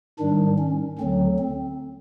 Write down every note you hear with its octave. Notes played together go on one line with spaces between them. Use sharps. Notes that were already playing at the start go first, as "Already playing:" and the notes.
G#2 D#3 G3 D4
C#4
D2 D3 F#3 C4
C4